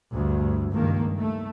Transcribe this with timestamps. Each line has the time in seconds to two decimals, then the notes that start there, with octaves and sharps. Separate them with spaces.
0.11 D2 G2
0.71 C#2 G2 D#3 A#3
1.18 A3